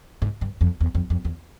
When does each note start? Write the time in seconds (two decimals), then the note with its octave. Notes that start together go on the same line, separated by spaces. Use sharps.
0.22 G#2
0.41 G2
0.61 F2
0.80 E2
0.95 F2
1.10 F2
1.25 E2